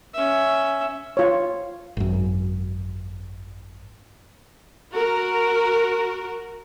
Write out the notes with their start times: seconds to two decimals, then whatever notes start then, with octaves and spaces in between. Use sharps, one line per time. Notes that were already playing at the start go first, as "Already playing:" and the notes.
0.14 C#4 E5
1.17 F4 C#5
1.97 G#1 F#2
4.93 F#4 A#4